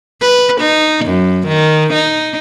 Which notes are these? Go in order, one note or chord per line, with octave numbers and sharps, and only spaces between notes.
B4
D#4
F#2
D#3
D#4